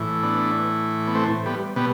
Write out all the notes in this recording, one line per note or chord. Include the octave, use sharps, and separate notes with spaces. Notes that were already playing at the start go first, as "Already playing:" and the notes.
Already playing: A2 E3
B3 D4
B3
A3 C4
G3 B3
B2 G3 B3